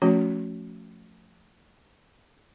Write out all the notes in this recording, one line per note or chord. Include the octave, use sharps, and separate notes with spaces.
F3 A3 C#4 F#4